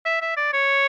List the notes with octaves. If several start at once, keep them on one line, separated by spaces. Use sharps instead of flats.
E5
E5
D5
C#5